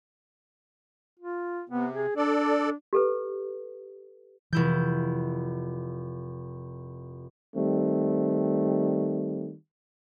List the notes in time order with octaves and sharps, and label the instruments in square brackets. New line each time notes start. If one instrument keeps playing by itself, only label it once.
[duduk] F4
[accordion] C3 [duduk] B3
[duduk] G#4
[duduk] D4 [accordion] A4 D5
[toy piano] G4 A4 B4
[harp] F1 E4 G6 [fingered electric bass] E3
[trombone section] D#3 G3 A3 C4